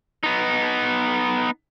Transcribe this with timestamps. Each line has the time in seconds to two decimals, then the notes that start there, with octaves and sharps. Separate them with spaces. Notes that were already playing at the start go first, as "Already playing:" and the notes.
0.23 B3 D#4